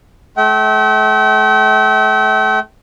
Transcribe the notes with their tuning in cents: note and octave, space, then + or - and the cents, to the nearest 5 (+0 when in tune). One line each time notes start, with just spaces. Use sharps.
A3 -40 E5 -30 G5 -40